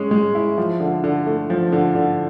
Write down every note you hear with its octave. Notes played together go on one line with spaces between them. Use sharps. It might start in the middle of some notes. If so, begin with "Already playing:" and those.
Already playing: G#3 C#4
G#3
E4
F3
D3
D3
A3
F3
D3
D3